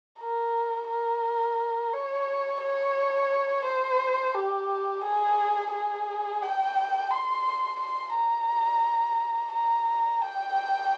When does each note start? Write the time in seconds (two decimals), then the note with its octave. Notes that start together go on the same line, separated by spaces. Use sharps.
0.19 A#4
0.89 A#4
1.93 C#5
2.62 C#5
3.65 C5
4.35 G4
5.04 G#4
5.72 G#4
6.43 G5
7.11 C6
7.80 C6
8.15 A#5
9.53 A#5
10.22 G5